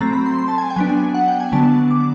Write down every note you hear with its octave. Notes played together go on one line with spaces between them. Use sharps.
F#3 A3 C4 A#5
B5
C6
C6
A5
G#5
G5
F#3 B3 D4 G#5
F#5
G5
G#5
D3 F#3 B3 D4 A5
D6